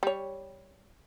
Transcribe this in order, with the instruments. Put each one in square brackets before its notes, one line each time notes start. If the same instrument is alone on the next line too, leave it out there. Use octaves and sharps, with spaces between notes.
[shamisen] G3 C#5